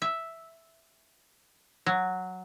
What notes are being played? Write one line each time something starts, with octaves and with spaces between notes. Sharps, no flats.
E5
F#3